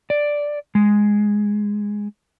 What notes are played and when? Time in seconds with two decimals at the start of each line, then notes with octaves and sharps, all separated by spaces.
0.10 D5
0.75 G#3